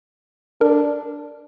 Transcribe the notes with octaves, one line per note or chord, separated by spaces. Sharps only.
D4 A#4